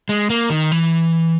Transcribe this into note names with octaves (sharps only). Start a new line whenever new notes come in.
G#3
A#3
D#3
E3